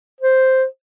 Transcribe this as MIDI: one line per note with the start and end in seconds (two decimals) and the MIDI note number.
0.21 0.65 72